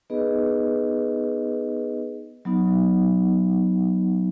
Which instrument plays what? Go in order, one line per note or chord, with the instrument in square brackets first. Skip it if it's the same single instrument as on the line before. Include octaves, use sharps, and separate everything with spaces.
[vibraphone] B3 D#4 G#4 B4 D#5
F#3 B3 D#4